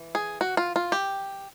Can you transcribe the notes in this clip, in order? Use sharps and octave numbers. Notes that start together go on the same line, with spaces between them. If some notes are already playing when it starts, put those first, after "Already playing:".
Already playing: E3
G#4
F#4
F4
F4
G4